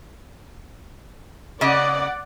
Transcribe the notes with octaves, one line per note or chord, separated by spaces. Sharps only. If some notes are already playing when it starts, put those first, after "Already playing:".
C#3 D5 D#5 F#5